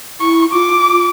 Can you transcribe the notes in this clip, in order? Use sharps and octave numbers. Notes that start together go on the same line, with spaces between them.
E4 C#6
F4 D6